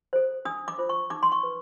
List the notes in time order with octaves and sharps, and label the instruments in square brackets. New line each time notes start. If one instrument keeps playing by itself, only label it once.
[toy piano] A4 C5
D4 D#6
D6
F4 A4 C5
C#6
D#4 D6
C6
C#6
B4